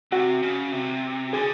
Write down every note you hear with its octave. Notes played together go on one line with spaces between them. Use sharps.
C3 F#4
C#3
C3
D3 G#4